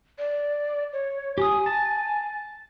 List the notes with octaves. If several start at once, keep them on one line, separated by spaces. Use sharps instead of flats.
D5
C#5
G4 G#5 D#6
A5